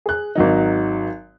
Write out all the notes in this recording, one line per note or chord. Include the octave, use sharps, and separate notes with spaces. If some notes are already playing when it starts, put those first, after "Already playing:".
G#4 F#6
G#1 F#3 D#4